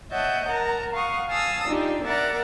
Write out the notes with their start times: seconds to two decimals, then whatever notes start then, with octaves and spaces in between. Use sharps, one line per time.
0.11 C#5 D#5 E5 F#5 A5 G6
0.48 A#4 F#5 A5 A#5
0.93 F5 F#5 C#6 D#6
1.28 F5 G#5 A5 D#6 E6
1.66 D4 D#4 F4 G4
2.04 A#4 D5 E5 F#5 A#5 A6